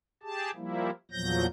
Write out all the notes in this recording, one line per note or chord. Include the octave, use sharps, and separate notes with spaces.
G4 G#4 A5
F3 G3 A#3 E4
E2 A#2 F3 F#3 G6 A#6